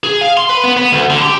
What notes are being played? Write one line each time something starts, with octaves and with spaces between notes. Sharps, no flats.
G#4
F5
C6
B4
B3
B3
D2
D3
G4